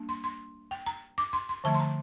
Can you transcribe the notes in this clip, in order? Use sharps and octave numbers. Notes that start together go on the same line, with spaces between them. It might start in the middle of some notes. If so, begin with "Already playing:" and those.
Already playing: G3 A#3 D4
C6
C6
G5
A#5
D6
C6
C6
D3 F3 A3 A5
C6
A#5